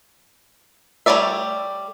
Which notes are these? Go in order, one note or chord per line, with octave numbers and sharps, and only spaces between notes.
G3 A3 C#5 D5 E5